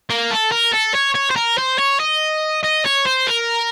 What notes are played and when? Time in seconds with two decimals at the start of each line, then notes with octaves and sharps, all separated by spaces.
0.10 A#3
0.31 A4
0.52 A#4
0.73 A4
0.95 C#5
1.15 C#5
1.31 C5
1.36 A#4
1.58 C5
1.78 C#5
2.00 D#5
2.63 D#5
2.85 C#5
3.06 C5
3.27 A#4